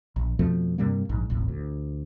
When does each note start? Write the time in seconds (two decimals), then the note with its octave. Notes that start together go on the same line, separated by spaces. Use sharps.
0.16 A#1
0.39 F2 B2 F3 A3
0.78 G2 C3 G3 A#3
1.09 A#1 G#2
1.30 D#1 G#1 A2
1.48 D2